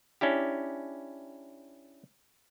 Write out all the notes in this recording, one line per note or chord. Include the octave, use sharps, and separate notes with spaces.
C#4 D4 E4 G4